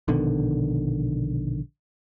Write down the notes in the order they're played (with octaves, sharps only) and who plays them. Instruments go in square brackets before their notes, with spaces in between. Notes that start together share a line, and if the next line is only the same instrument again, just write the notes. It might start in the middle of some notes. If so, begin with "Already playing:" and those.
[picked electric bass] A#1 B2 D3 D#3